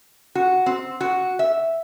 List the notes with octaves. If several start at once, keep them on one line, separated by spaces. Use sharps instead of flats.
F#4
C4
F#4
E5